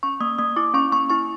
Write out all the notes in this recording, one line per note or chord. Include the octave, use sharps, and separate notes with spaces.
C#4 C#6
A#3 D#6
A#3 D#6
E4 D6
C#4 C#6
A#3 C#6
E4 C#6